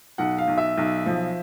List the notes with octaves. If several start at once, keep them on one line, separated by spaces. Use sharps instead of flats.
B1 F#5
F5
B1
E5
B1
F3